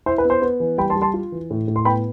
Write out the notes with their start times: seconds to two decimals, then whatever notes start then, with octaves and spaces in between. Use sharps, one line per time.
0.06 E4 C5
0.18 B4
0.25 B3
0.30 C5
0.42 B3
0.60 E3
0.78 G3 G5 B5
0.90 A5 C6
0.95 G3
1.02 A5 C6
1.14 F4
1.32 E3
1.50 A2
1.68 A2
1.76 C6
1.85 B3 G5 B5